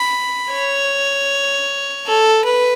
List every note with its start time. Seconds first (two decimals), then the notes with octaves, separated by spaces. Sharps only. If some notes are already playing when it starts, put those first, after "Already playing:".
Already playing: B5
0.52 C#5
2.07 A4
2.45 B4